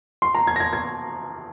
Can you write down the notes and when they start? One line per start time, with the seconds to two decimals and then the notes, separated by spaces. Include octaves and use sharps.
0.22 C6
0.35 A#5
0.47 G#6
0.56 A#6
0.60 G#6
0.73 G#6